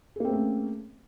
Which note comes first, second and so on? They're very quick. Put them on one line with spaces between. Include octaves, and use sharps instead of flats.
G#4 A#3 C4 A3 C#4